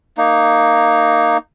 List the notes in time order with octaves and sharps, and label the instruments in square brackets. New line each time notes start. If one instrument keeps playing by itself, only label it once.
[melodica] A#3 D#4